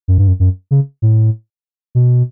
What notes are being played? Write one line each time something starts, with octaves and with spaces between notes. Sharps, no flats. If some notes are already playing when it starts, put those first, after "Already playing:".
F#2
G2
F#2
F#2
C#3
A2
B2